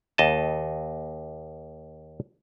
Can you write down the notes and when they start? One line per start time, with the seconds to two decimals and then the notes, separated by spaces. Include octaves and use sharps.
0.18 D#2 D#5 A5